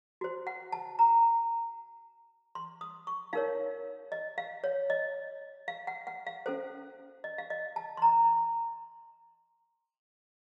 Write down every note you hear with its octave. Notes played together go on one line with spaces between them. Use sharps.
F#4 C5
F#5
A5
A#5
C6
D#6
C#6
D#4 A#4 C#5 F5
D#5
F5
C#5
D#5
F5
F#5
F#5
F5
C#4 A4 C5
D#5
F5
D#5
A5
C6
A#5